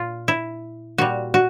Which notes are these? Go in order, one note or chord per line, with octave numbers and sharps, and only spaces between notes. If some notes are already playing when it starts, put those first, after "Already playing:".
Already playing: A#2 F4
E4
A#2 G3 F#4
F#4